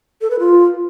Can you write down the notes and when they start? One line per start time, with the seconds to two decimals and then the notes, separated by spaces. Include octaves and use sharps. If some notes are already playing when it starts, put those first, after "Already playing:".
0.21 A4
0.30 B4
0.39 F4